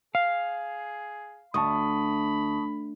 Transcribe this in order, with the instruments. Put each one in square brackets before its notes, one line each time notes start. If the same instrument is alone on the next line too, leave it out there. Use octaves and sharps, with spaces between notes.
[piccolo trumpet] G#4 [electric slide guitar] F5
[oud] D2 [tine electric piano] A5 C#6 D#6 [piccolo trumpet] B5